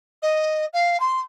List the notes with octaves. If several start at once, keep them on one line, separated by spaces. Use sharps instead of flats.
D#5
F5
C6